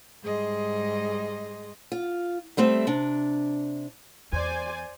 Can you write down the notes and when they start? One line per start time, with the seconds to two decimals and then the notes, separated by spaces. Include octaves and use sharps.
0.22 G#2 G3 G#4 D#5 C6
1.92 F4
2.57 G3 A3 C4 E5
2.87 C3 D4
4.32 E2 C5 D5 G#5